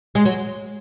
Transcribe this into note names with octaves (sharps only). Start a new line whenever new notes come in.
G#3
F#3